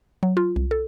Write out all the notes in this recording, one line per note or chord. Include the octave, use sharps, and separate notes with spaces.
F#3
F4
C2
A4